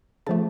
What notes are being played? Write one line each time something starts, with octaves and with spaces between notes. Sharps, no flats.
C#3 F3 A3 A5